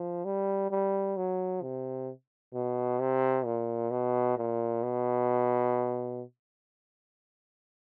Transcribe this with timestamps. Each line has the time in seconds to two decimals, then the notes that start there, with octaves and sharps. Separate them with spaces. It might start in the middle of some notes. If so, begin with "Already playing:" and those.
Already playing: F3
0.25 G3
0.71 G3
1.17 F#3
1.62 C3
2.54 B2
3.00 C3
3.45 A#2
3.91 B2
4.37 A#2
4.83 B2